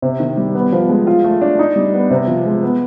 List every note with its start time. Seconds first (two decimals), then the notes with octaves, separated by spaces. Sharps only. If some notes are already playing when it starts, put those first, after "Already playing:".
0.02 C3
0.20 D#3
0.37 G3
0.55 B3
0.72 F3
0.89 G#3
1.07 F4
1.24 A3
1.41 D4
1.59 D#4
1.76 G3
1.93 B3
2.11 C3
2.28 F3
2.46 G#3
2.63 B3